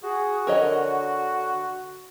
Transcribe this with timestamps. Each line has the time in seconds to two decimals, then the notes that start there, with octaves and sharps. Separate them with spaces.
0.03 F#4 G#4
0.47 D3 A#4 C#5 D#5